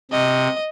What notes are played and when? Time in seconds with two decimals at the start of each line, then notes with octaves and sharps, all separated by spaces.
0.11 C3 D#5